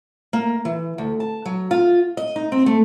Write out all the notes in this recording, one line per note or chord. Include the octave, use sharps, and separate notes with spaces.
A#3
E3
D2
A5
F#3
F4
D#5
D#4
C4
A3